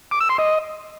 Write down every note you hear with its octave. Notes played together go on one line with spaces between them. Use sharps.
D6
E6
C6
D#5